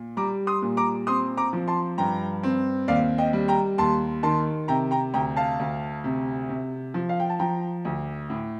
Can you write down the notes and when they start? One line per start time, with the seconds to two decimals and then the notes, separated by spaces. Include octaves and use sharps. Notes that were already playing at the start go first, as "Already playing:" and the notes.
Already playing: A#2
0.17 G3 A#5 D6
0.47 C6 D#6
0.62 A#2
0.77 A#5 D6
1.07 C4 C6 D#6
1.37 A#5 D6
1.53 F3
1.68 A5 C6
1.98 G2 G5 A#5
2.43 C4
2.88 D#2 D5 F5
3.18 D#5 G5
3.33 G3
3.48 G5 A#5
3.78 D#2 A5 C6
4.23 D#3 A5 C6
4.68 C3 G5 A#5
4.91 G5 A#5
5.14 D2 G5 A#5
5.37 F5 A5
5.59 D2
6.04 C3
6.49 C3
6.94 F3
7.09 F5
7.20 G5
7.30 A5
7.39 F3 G5 A#5
7.85 D2
8.30 A2